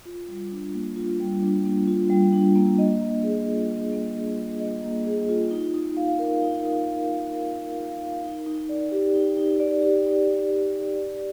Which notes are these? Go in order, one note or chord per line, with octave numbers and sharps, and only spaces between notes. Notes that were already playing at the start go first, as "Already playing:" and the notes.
F4
G3
D4
A#3
F4
G3
D4
A#3
F4
G3
D4
A#3
D#5
A#3
G#4
F4
D#5
A#3
G#4
F4
D#5
A#3
G#4
F4
D#4
D#4
F5
A#4
D#4
D#4
F5
A#4
D#4
D#4
F5
A#4
D#4
D#4
D5
G4
D#4
D#4
D5
G4
D#4
D#4
D5
G4
D5